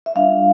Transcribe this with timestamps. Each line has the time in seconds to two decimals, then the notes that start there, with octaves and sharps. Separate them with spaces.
0.06 E5
0.15 G3 D4 F4 F5